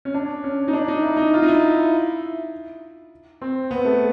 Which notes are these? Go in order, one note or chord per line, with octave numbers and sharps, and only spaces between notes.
C#4
D4
C#4
D#4
D4
D#4
E4
D#4
F4
D#4
E4
C4
B3
A3